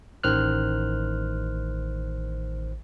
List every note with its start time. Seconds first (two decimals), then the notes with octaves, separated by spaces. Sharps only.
0.23 A1 D#3 C5 F6 F#6